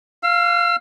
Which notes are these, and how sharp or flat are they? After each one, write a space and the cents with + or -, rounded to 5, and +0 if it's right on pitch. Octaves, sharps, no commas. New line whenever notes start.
F5 +0 E6 +40